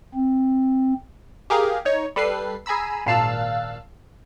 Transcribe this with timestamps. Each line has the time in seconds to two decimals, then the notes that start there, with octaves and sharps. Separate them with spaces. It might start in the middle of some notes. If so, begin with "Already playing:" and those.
0.15 C4
1.50 G4 G#4 A#4 F5
1.85 D#4 C#5
2.16 G3 A4 B4 C7
2.66 G#4 G#5 A#5 B5 E6
3.06 G#1 A#2 F5 A5 E6 F#6